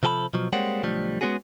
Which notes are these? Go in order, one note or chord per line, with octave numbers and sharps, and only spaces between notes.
C3 F3 A4 G#5 B5
B2 F3 F#3
G3 G#3 A#3 C4 C#5 F#5
B1 D3 F3 G3 A3
G#3 A#3 B3 C#4 F#4 G#4